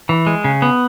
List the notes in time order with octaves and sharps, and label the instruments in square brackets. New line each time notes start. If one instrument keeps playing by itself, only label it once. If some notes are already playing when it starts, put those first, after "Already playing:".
[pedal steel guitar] E3
G#3
C#3
B3